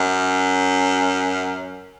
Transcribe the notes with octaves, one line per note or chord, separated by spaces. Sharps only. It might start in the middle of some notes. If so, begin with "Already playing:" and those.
Already playing: F#2